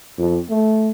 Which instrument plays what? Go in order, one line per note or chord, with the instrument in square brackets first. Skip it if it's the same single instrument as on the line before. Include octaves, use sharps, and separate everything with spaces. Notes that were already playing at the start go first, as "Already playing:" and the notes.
[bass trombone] F2
A3